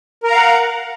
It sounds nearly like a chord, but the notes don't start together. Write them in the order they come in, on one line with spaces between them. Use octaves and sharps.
A#4 A#5 F5 F#5